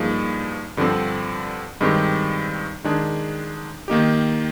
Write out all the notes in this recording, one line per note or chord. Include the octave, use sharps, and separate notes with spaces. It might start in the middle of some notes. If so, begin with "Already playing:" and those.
Already playing: G2 F3 A#3 D#4 G#4
G2 D3 F3 C4
G2 D#3 G#3 C4 G4
D#3 G#3 D4 G#4
D#3 A#3 D#4 G4